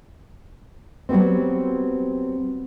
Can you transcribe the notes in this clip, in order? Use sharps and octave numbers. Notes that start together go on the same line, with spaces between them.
F#3 G3 B3 C4